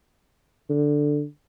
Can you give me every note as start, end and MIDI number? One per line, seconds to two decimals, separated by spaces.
0.69 1.23 50